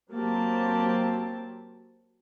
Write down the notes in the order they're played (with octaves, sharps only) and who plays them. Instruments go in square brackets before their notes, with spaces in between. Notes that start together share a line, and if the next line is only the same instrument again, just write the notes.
[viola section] F#3 A#3 C4 G4 A5